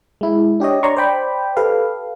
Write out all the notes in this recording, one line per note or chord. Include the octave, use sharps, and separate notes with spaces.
G#3 E4
D4 G4 C#5 D#5
C#5 D5 A#5 C6 C#6
C5 D5 G5 B5
G4 A4 B4 F5